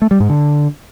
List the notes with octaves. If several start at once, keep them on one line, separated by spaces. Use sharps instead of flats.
A3
G3
G#2
D3